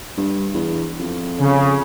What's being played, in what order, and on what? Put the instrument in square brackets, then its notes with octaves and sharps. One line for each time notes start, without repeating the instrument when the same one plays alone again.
[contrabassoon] G2
E2
F2
[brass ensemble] C#3